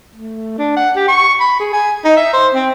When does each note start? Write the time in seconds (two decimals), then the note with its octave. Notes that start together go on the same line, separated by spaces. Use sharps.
0.15 A3
0.58 D4
0.77 F#5
0.96 G4
1.08 C#6
1.40 B5
1.60 G#4
1.73 G#5
2.05 D#4
2.17 E5
2.33 C5
2.54 C4